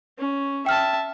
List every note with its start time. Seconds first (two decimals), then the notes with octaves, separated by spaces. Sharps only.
0.18 C#4
0.66 E5 G5 A5 F6